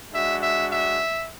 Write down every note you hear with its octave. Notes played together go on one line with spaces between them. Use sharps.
G#3 D4 F#4 E5
E5
E5